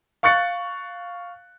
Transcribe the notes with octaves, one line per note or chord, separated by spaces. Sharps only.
F5 C#6 F#6 A6 C#7